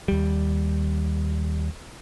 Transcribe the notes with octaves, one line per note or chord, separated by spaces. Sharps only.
D#2 G3